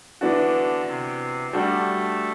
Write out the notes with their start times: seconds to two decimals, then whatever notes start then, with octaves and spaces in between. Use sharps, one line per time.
0.21 D3 E3 B3 D4 F#4
0.87 C3
1.53 G3 A3 D4 F#4